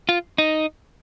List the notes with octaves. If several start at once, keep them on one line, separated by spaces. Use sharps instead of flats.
F4
D#4